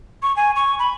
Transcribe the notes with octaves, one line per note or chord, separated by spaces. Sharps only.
C#6
G#5
C#6
B5